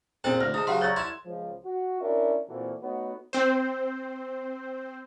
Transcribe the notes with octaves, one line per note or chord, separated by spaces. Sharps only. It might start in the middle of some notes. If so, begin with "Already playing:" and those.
A#2 C4 E4 G#4 A4 C5 G5 A5
D2 F6 A#6
G#2 E4 A5 D#6
C#3 F#3 G4 E5 F#5 C6
C#5 D5 A#5 C#6 E6 F#6 A6 G7
E4 C6 G#6 E7
C#2 F3
F#4
C#4 D4 E4 A#4 D5 E5
A#2 E3 A#3 C4 F#4 A4
A3 B3 D#4 F#4 B4 C#5
C4 C5